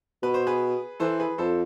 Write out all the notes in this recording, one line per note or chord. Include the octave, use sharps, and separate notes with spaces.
B2 B4
C5
G#4 B4
E3 A4 C5
G#4 B4
F2 A4 C5